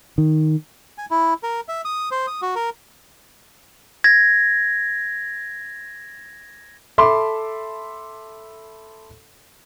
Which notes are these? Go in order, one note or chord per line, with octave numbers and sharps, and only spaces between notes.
D#3
G#5
E4
A#4
E5
D#6
C5
D#6
F#4
A#4
G#6 A#6
A4 E5 A5 B5 C6 D6